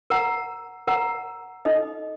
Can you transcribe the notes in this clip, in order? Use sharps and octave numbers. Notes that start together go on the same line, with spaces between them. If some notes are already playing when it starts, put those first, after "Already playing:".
A#4 F#5 A#5
A#4 F#5 A#5
D#4 A4 D#5